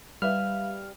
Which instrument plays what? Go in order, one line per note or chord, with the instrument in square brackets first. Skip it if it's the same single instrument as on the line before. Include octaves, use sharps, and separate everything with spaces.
[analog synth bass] G3 [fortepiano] B4 E5 [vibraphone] F5 [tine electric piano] F6